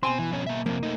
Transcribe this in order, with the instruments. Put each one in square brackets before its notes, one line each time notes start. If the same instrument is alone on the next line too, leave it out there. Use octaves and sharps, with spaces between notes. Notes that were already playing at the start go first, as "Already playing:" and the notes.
[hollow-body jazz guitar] B2 G#5 C6 [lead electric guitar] C4
[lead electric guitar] E3
F2 C#4
A#3 E5
[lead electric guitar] F2 C3 [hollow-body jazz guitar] A#3
[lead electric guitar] A3 D#4